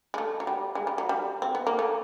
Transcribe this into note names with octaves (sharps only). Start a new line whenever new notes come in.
G#3
A3
F#3
G3
G#3
G3
F#3
G3
C4
B3
A#3
A3